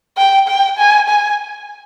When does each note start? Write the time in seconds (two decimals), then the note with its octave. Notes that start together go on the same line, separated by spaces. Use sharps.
0.17 G5
0.48 G5
0.78 G#5
1.08 G#5